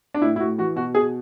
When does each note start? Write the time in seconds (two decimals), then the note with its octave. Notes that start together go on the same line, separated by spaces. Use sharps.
0.14 D4
0.22 A2 E4
0.36 E4
0.40 A2 F#4
0.58 E3 F#4
0.76 B2 F#4
0.95 B2 G#4